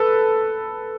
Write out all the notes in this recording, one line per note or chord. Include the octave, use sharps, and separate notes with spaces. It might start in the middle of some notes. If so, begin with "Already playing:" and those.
Already playing: A4 B4